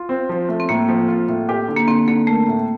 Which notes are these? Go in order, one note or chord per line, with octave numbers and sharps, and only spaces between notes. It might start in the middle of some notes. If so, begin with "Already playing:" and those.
Already playing: F4
C4
F3
A3
C4
A2 A#3
F3
F4
A2
G4
D3
A#3
D3 C4
D3 A#3
A3 A#3
A2